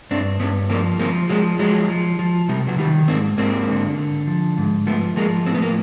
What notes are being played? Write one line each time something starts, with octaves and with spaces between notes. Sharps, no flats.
G2 C4 D4
G2 B3 C#4
F3 A#3 C4
F3 A#3 C4
F3 F#3 G#3
F3 F#3 G#3
F3
F3
C3 G3
F#3
D#3 G3
G#2 A#3 C4
G#2 A#3 C4
D3
D3
F3
G#2
F3 A3 B3
F3 G#3 A#3
A2 C4
B3
A#3